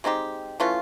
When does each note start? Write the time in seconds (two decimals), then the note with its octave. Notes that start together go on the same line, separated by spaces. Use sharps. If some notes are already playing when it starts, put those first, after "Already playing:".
0.04 G#3 C4 D#4 G4
0.60 E3 A3 C#4 F4